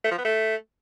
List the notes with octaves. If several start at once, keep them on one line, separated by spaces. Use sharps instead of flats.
A3
F3
B3
A3